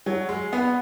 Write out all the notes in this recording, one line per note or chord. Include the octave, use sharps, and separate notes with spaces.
F#3
G#3
B3